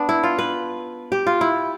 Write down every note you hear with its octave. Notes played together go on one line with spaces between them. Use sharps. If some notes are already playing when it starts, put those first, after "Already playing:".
Already playing: B3 D4
E4
F4
B4
G4
F4
E4